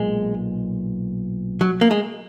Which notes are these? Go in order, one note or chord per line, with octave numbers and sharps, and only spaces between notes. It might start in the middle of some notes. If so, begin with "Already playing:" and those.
Already playing: B1 A#2 G#3
F#3
A#3
G#3